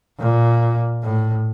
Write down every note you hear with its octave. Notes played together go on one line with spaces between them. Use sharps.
A#2
A2